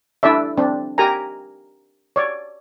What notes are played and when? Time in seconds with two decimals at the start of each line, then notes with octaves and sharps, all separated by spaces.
0.23 D4 E4 A4 D5 E5
0.58 C4 D4
0.98 G4 A#4 G#5 A#5
2.16 C#5 D5